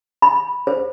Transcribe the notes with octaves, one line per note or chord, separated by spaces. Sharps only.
B5
C5